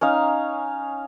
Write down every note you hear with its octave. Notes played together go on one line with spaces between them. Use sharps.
C#4 D#4 F5